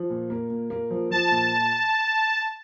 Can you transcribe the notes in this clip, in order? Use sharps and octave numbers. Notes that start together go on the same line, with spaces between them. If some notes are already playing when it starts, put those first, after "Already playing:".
Already playing: F3
A#2
A#3
A#2
A#3
F3
F3 A5
A#2